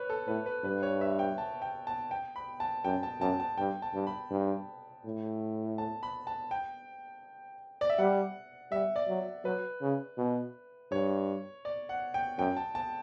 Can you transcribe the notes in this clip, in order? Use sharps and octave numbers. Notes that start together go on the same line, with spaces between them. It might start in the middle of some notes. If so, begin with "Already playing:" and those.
Already playing: B4 C#5
A4
A2 B4
B4
G2 B4
C#5
E5
G5
A5
G5
A5
G5
B5
A5
F#2 G5
A5
F#2 A5
A5
G2 G5
A5
G2
B5
G2
A2
A5
B5
A5
G5
D5
E5
G3 F#5
G3 E5
D5
F#3
F#3 B4
C#3
B2
G2 C#5
D5
F#5
G5
F#2 G5
A5
A5